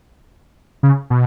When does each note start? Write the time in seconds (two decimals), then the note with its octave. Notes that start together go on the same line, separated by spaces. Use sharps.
0.83 C#3
1.10 B2